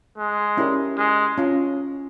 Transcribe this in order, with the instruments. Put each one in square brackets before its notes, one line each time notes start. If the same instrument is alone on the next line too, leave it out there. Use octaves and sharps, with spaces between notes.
[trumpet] G#3
[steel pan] C#4 E4 G4 A#4 D5
[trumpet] G#3
[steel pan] C#4 F4